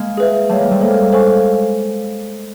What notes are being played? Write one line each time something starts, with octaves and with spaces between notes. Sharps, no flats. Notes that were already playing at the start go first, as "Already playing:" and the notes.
Already playing: G#3 A#3
G#4 B4 E5
G3 A3 C#5 F5 A5
G#3 A#3
G3 A3
G#3 A#3 A4 C5 E5
A4 C5 F5 G#5 C#6